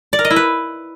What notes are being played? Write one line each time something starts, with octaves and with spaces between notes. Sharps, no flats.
D5
A#4
D#5
E4
B4